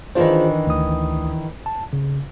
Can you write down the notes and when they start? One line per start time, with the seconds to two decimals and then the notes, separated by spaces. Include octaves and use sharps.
0.15 D#3 E3 D4 F4 G#4 C5
0.67 D2 D#6
1.66 A5
1.93 C#3